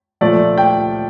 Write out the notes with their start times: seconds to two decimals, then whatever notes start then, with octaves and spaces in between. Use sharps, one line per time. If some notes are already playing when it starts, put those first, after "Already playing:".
0.21 A#2 F3 A3 D5
0.58 G5